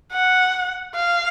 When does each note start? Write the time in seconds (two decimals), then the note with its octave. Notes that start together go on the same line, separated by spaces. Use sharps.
0.12 F#5
0.95 F5